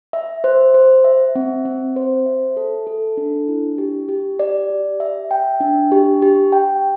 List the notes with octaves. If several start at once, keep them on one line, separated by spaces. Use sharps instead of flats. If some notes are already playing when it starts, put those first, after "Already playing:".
E5
C5
C5
E5
C4
C4
C5
E5
A4
A4
D4
E4
G4
G4
D5
G4
E5
G5
D4
G4
G4
G5